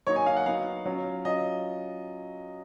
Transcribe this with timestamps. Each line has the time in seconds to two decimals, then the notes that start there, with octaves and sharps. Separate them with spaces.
0.07 F#3 A#3 D#4 C#5
0.16 G#5
0.26 F5
0.36 F#5
0.46 F#3 B3 D#4 F5
0.85 F#3 C#4 F4
1.25 F#3 C#4 F4 D#5